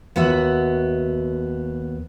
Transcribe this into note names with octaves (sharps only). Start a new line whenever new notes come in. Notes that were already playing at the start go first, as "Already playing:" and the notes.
D#2 B3 F#4 E5